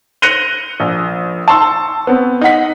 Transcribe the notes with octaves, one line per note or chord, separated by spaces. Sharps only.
F#6 A#6 C#7 D#7 F7 G7
A#1
A5 C6 C#6 E6
B3 C4
D#4 D#5 F#5 B6